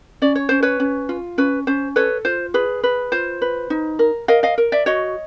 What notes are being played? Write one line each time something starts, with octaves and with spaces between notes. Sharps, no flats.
C#4 D5
C#5
C#4 C5
B4 C#5
C#4
F4
C#4 B4
C#4 C5
A4 B4 C#5
F4 C5
G#4 B4
B4
F4 C5
B4
D#4
A#4
A#4 D#5 F5
D#5 F5
A#4
D5 E5
F#4 C#5 D#5